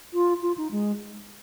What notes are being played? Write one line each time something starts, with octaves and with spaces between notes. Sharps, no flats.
F4
F4
D#4
G#3